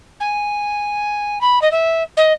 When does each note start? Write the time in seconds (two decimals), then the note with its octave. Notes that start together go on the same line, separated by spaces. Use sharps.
0.20 G#5
1.41 B5
1.61 D#5
1.71 E5
2.17 D#5